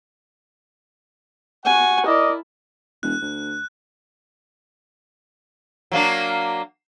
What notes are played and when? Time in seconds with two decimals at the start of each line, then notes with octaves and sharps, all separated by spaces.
1.65 F#4 F#5 G#5
2.06 E4 A#4 D5 D#5
3.03 E1 F#6
3.21 D2
5.92 F#3 A#3 D4